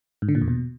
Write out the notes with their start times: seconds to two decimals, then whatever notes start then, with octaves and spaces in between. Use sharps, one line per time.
0.22 G#2
0.29 D3
0.35 A#2
0.41 E2
0.48 B2